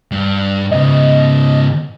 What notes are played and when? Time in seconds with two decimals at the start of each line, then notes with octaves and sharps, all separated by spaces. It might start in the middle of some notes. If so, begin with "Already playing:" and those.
0.12 G2
0.71 G#2 C#3 D#5